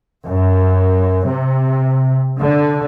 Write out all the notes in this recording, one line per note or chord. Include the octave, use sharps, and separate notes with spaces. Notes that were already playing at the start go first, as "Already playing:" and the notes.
F#2
C3
D3